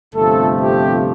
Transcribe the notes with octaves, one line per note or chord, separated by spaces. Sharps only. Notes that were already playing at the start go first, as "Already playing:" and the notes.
G1 F2 C3 F3 A3 A4
G4